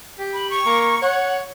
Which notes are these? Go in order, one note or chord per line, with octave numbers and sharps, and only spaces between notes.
G4
B5
C#6
A#3
C#5 F#5